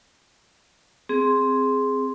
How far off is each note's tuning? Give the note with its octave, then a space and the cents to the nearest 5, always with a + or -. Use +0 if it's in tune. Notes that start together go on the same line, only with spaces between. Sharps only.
C4 +0 G#4 +0